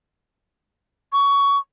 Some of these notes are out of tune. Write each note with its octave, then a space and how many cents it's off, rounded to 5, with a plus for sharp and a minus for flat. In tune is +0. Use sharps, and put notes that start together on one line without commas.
C#6 +20